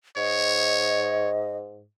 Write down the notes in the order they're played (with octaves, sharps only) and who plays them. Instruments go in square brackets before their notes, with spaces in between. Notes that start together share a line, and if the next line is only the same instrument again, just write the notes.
[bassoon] G#2 [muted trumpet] C#5 [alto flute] D#5